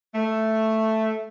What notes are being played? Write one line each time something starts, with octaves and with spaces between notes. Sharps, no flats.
A3